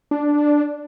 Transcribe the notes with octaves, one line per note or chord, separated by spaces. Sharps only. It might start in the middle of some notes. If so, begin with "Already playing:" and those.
D4